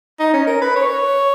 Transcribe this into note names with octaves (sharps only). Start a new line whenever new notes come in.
D#4
C#4
A#4
B4
C#5